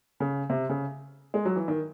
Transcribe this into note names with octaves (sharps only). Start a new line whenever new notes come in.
C#3
C3
C#3
G#3
F#3
E3
D#3